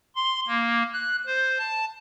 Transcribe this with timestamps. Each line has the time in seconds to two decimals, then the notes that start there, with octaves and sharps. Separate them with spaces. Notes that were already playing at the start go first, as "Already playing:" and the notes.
0.15 C6
0.48 A#3
0.94 F#6
1.27 C5
1.58 A5